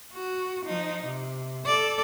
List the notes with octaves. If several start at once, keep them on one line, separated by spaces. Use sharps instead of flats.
F#4
F3 D#4
C3
A4 D5